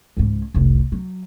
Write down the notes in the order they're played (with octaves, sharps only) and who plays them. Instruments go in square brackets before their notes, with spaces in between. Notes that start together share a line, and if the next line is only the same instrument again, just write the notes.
[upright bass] C#2 G#2
F1 C2
F#3